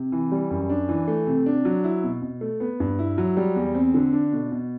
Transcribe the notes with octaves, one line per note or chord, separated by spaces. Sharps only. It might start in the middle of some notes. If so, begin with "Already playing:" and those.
Already playing: C3
E3
G3
F#2
D4
E3
A3
C3
D4
F#3
E4
B2
B2
A3
B3
G2
E4
F#3
G3
E2
C4
D3
D4
B2
B2